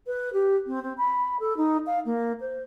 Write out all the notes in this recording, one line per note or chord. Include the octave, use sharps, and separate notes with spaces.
B4
G4
C4
C4
B5
A4
D#4
F5
A#3
C5